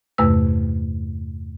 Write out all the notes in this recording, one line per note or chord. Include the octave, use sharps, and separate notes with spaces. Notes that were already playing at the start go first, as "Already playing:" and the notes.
E2 G2 C3 A3 B4 E6